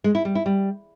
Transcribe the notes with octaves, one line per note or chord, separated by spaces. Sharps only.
G#3
E4
G3
E4
G3